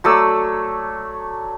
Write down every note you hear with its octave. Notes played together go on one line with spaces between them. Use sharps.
F#3 A3 D5 E6